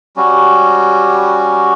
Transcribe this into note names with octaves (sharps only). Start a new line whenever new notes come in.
G3 C#4 F#4